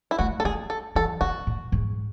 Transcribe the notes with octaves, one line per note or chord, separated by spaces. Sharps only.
E4
A3 F#4
A4
G#3 G#4
A4
E3 A4
C#3 F#4
A2
G#2